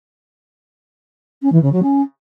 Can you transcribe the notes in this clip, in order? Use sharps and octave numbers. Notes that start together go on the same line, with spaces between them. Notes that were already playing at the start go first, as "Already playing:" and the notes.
C#4
E3
C#3
F#3
C#4